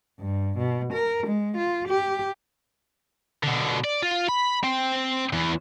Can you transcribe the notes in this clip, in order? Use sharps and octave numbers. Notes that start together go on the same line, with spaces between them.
G2
B2
A#4
G#3
F4
G4
B2 D3
D5
F4
B5
C4
E2 E3